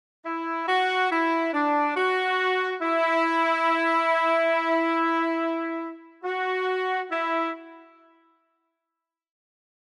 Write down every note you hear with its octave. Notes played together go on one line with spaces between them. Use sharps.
E4
F#4
E4
D4
F#4
E4
F#4
E4